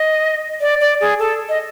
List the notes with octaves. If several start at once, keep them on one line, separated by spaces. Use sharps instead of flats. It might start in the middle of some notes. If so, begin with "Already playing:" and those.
Already playing: D#5
D5
D5
G#4
A4
D#5